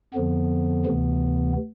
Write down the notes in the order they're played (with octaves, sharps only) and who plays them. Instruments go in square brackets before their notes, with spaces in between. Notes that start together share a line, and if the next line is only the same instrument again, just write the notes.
[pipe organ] F2 D3 F3 B3
D2 C3 E3